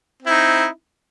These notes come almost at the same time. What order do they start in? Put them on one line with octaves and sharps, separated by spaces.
C4 E4 D#4